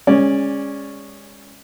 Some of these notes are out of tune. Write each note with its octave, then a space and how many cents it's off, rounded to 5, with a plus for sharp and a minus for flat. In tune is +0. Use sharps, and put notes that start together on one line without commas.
G#3 -25 C#4 +0 D5 +0